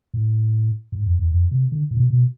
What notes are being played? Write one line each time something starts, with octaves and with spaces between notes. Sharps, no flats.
A2
G#2
F2
E2
F2
C3
D3
A2
B2
B2